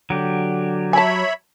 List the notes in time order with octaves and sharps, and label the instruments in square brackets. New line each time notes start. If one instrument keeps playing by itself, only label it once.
[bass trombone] D3 [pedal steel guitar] F#3 G4
[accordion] C#5 E5 B5 [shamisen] G#5 A5